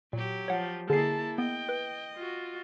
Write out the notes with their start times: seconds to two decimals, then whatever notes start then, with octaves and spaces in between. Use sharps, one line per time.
0.13 A#2 F#3 G4
0.48 F3 C#5 F#5
0.90 D3 A#3 E4 G#4 A5 C7
1.38 B3 D#5 G5
1.69 B4
2.16 F4 F#4